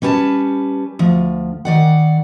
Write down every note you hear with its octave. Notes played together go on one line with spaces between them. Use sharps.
G3 C#4 B4 G#5 A5
D2 F3
D#3 D5 F#5